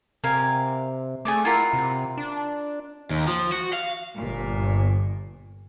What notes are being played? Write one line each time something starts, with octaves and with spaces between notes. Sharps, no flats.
C3 A#4 F5 G#5
A3 G#4 D5 D6
E4 F4 A#4 F#5
C3
D4
D#2
F3
F#4
F5
G1 A#2